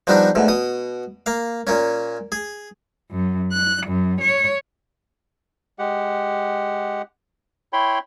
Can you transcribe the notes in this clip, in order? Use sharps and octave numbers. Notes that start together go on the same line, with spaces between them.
F3 G3 B3 D4 D#4
D2 G#2 B2
B2 D#6
A#3 F5
A#2 A#3 C#4
G#4
F#2
F#6
F#2
C#5
G#3 G4 F#5
E4 C#5 G5 B5 C6